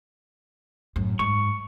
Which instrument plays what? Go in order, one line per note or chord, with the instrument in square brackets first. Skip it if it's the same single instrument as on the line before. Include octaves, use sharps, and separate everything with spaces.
[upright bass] F#2 A2
[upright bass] G#2 [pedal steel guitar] C#6